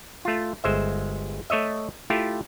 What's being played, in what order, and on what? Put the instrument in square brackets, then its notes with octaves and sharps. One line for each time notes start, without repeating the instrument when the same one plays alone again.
[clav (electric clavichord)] A3 F4
G1 G#3 C5 E5
A3 C#5 D#5 E5
A3 E4 F4 G4